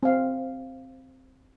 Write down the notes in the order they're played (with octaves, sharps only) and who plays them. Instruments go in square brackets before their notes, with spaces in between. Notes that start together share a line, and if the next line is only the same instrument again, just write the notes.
[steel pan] C4 F5